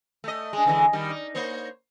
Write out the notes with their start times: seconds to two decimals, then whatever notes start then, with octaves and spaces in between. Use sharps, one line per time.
0.24 A3 D#5
0.53 G#3 D4
0.66 D3 E3 G#3
0.93 D#3 G3
1.10 D#4
1.35 A#3 C5 C#5